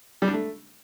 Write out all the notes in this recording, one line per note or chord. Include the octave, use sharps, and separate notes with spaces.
G3
D4
A3